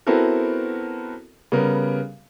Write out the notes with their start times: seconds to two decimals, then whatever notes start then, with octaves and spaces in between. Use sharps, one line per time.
0.07 B3 C4 E4 F#4 A4 A#4
1.52 C#3 G3 B3 A#4